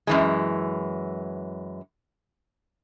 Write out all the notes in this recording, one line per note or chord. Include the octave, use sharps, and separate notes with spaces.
F#2 E3 G#3